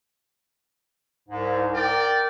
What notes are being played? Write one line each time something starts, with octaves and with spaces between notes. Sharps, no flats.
C2 G#2
A#4 D5 G5